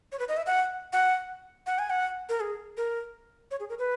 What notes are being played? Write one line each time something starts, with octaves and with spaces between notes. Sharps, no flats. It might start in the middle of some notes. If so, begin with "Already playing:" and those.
C#5
B4
D#5
E5
F#5
F#5
F#5
G#5
F#5
A#4
G#4
A#4
C#5
G#4
A#4
B4